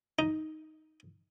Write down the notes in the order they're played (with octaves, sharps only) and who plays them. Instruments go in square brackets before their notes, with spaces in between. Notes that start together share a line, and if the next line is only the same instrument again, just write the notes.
[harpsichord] D#4